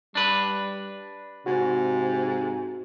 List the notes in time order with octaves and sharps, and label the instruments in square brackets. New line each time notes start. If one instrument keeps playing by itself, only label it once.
[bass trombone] G3 [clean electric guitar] D4 B4
[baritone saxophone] G#2 [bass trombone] C3 [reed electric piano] F#4